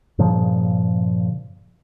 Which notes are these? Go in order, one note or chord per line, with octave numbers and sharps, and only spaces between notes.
G2 A#2 C#3 F3